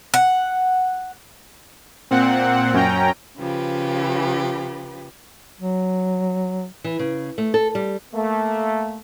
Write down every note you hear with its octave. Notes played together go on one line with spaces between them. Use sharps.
F#5
A#2 C4 F#5
F#2 C#4 G5 A#5
C#3 F3 G4 B4
F#3
E3
C#3
A3
A4
G3
A3 A#3